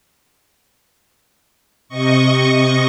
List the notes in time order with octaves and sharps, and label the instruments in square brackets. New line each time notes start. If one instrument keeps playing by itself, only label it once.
[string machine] C3 D#5 C#6